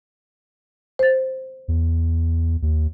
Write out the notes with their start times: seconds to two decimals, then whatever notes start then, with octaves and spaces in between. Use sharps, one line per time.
0.99 C5 A6
1.68 E2
2.62 D#2